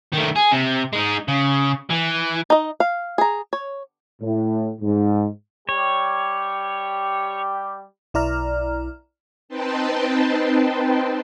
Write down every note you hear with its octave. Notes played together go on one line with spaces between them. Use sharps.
D#3 A3
G#4
C3
G#3 D#4
C#3
E3
D#4 D#5
F5
G#4 A#5
C#5
A2
G#2
G3 G4 C#5
B1 E4 D5 A#5 F6
C4 D#4 B4 G5 A5 C6